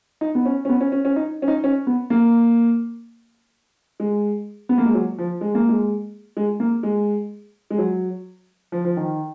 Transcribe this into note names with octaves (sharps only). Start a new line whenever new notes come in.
D#4
B3
C#4
C#4
B3
C#4
C#4
C#4
D#4
C#4
D#4
C#4
B3
A#3
G#3
B3
A#3
G#3
F#3
F3
G#3
A#3
G#3
G#3
A#3
G#3
G#3
F#3
F3
F3
D#3